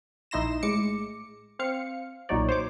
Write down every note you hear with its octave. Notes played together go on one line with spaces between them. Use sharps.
A#1 D#4 E4 C6 A#6 E7
A2 G#3 D6 C#7
C4 F5 C#7
B1 A#2 F#3 D#4 C#5 D5
C5 C#5 D6